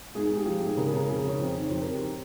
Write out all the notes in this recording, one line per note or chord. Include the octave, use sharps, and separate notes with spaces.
G#2 G#4
G#4
G#2
G4
F3 G4
G4
G#2
G#4
C#3 A#4
G#4
C#3 A#4
F2 G#4
C#3 C#5
F2 C5
D#3
C#5
F2 C5
A#4
F2
G4
G4